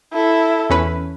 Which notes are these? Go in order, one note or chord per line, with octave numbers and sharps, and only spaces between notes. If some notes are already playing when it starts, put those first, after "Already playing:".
E4 A4
E2 C#4 B4